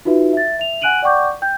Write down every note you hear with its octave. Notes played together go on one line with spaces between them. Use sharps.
D#4 F4 F#4 B4 E5
E5 A6
E5 F7
F#5 G#5 F#6 D7 D#7 F#7
D5 F#5 G5 C#6 D6 G6
G5 G6